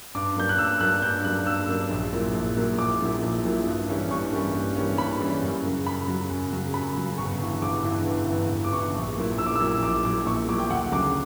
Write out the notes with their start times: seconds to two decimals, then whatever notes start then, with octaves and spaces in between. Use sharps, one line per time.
0.15 G2 D6
0.36 F#3 A#3 D4 G6
0.49 F#6
0.58 G2 E6
0.81 F#3 A#3 D4 F#6
1.02 G2 G6
1.25 F#3 A#3 D4 F#6
1.46 G2 E6
1.68 F#3 A#3 D4
1.90 A#1
2.12 A#2 F#3 A#3 E4
2.34 A#1
2.57 A#2 F#3 A#3 E4
2.78 A#1 D6
3.00 A#2 F#3 A#3 E4
3.22 A#1
3.44 A#2 F#3 A#3 E4
3.66 G2
3.89 E3 G3 A#3 C#4
4.11 G2 C#6
4.32 E3 G3 A#3 C#4
4.54 G2
4.77 E3 G3 A#3 C#4
4.98 G2 B5
5.21 E3 G3 A#3 C#4
5.43 F#2
5.64 C#3 F#3
5.86 F#2 B5
6.08 C#3 F#3
6.30 F#2
6.52 C#3 F#3
6.74 F#2 B5
6.97 C#3 F#3
7.18 G1 C#6
7.40 G2 E3
7.62 G1 D6
7.84 G2 E3
8.06 G1
8.29 G2 E3
8.51 G1
8.64 D6
8.73 G2 E3 C#6
8.94 A#1
9.16 A#2 F#3 A#3 E4
9.38 A#1 E6
9.46 D6
9.55 E6
9.60 A#2 F#3 A#3 E4
9.82 A#1 D6
10.04 A#2 F#3 A#3 E4 D6
10.26 A#1 C#6
10.48 A#2 F#3 A#3 E4 D6
10.60 G5
10.70 D2 F#5
10.92 C#3 F#3 D6